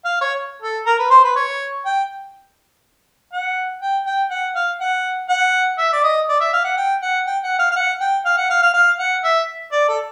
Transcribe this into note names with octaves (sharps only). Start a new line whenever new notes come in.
F5
C#5
A4
A#4
B4
C5
B4
C#5
G5
F#5
G5
G5
F#5
F5
F#5
F#5
E5
D5
D#5
D5
E5
F5
F#5
G5
F#5
G5
F#5
F5
F5
F#5
G5
F5
F#5
F5
F5
F5
F#5
E5
D5
A4